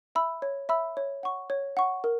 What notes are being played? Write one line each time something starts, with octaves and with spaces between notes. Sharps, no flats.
E5 B5 E6
C#5
E5 B5 E6
C#5
F#5 C#6
C#5
F#5 C#6
A#4